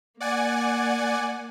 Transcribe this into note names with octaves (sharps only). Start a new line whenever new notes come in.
A#3 D5 F#5 G#5